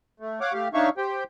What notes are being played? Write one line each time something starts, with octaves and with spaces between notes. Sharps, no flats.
A3
C#5 F5 F#5 D6
A3 G4 F5
D4 D#4 C#5 E5 F5 C#6
G4 C5 G5